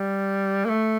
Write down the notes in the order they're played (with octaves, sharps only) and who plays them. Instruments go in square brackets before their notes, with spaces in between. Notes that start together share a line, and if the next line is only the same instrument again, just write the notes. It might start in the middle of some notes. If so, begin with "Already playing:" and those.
Already playing: [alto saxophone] G3
A#3
A3